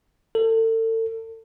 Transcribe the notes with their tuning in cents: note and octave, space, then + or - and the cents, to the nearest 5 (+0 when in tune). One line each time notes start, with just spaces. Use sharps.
A4 +35